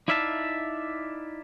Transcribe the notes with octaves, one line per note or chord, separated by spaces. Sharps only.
D#4 E4 D5 E5 F5 A5